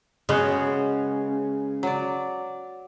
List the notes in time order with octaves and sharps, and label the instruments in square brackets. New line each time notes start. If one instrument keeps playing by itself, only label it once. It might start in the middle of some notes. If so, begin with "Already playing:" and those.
[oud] C#3 [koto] G#3 B3 F#4
[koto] F#3 D5